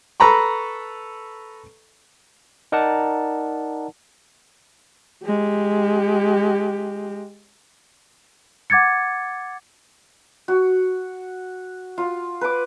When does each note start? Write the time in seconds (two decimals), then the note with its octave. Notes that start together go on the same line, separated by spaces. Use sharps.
0.20 A4 B4 A#5 B5 C#6
2.72 D#4 A#4 D5 F#5 A5
5.24 G#3 G4
8.70 F#5 D6 G#6 A6 C#7
10.48 F#4
11.98 F4
12.41 B4 D6